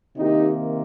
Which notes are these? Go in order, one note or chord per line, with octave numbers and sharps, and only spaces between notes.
C3 D#3 A#3 D#4 G4